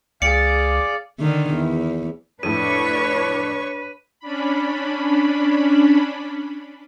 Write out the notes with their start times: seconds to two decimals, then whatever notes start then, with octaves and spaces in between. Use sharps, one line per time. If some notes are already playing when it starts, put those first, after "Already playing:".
0.22 C#2 G#4 D5 F5 C#7
1.20 D3 D#3
1.55 E2
2.43 F2 A2 D4 B4 C#5 C#6 D#7
4.20 C#4 D4 B5